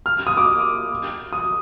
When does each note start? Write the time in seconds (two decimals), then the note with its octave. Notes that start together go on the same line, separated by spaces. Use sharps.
0.06 F6
0.27 D#6
0.37 D6
1.33 D#6